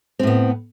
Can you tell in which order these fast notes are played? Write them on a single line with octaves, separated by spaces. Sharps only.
C4 A2 B3